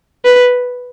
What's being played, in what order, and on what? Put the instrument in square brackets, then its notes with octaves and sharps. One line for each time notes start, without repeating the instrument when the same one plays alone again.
[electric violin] B4